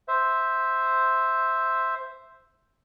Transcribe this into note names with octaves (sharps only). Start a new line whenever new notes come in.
C5 E5